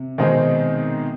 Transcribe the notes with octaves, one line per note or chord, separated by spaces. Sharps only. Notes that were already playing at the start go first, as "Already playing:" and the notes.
Already playing: C3
B2 D#3 G#3 C4 D#4 G#4